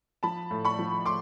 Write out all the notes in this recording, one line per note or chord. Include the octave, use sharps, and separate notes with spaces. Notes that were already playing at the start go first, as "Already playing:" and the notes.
F3 A5 B5
A2
B5 C#6
F3
A2 C6 D6